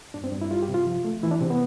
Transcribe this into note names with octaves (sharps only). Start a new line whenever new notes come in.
G2 D4
C4
G2 D4
E4
G3 F4
G4
C3
F4
F3
A3
E3 E4
D4
C3 C4
B3